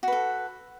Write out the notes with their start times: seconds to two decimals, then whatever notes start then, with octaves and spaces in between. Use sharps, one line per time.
0.03 F#4
0.08 B4
0.12 A4